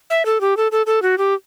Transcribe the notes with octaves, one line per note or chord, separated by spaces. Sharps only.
E5
A4
G4
A4
A4
A4
F#4
G4